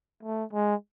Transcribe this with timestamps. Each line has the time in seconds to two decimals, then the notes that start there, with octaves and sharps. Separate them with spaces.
0.23 A3
0.53 G#3